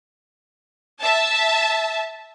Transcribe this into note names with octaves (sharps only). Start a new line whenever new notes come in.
E5 A5